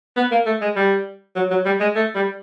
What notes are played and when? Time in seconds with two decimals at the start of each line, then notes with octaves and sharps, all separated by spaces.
0.16 B3
0.31 A#3
0.46 A3
0.61 G#3
0.76 G3
1.36 F#3
1.51 F#3
1.65 G3
1.80 G#3
1.95 A3
2.15 G3